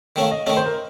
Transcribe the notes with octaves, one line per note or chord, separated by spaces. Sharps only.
D#3 A3 C#4 F5
D#5
D#3 A3 C#4 D#5
C5
A#4